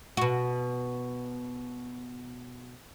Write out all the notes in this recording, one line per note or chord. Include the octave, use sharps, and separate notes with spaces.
B2 F#4